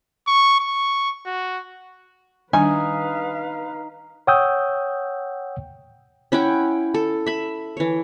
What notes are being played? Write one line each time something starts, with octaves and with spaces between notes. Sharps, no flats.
C#6
C#6
F#4
D#3 G3 D4 D#4 B4 F5 G#5
C#5 F#5 G5 D#6 E6 G6
C#4 E4 F#5 G5
A4
E5 B5
E3 C#5